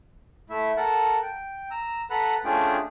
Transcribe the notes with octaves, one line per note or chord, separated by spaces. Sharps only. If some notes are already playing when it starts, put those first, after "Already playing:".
A3 E4 E5
A4 A#4 F#5 A5
G5
A#5 E6
A4 B4 F#5 A#5 B5 F#6
A3 C#4 D4 F4 G#4 G5